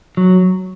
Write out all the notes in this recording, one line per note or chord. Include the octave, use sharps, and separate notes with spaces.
F#3